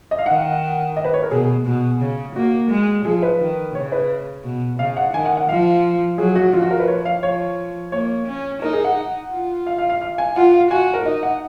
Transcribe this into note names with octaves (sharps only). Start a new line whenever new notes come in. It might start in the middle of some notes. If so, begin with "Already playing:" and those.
D#5
F5
D#3 F#5
D#5
B4
C#5
A#4
B2 G#4
B2
C#3
A#3 F#4
G#3
F3 G#4
B4
D#3
C#3 C#5
B4
B2
C#3 F5
F#5
D#3 G#5
F#5
F#5
F3 F5
F#3 G#4
F#4
F3 F4
F#4
A#4
B4
C#5
F5
F3 C#5
A#3 C#5
C#4
D#4 A#4
G#4
F#5
F4
F5
F5
F5
F5
G#5
F4 F#5
F5
F#4 G#5
A#4
D#4 D#5
F#5